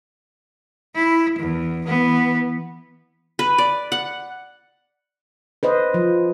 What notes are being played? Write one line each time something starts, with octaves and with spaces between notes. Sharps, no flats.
E4
E2
E3 B3
B4
D5
F#5
B4 C5 D#5
F3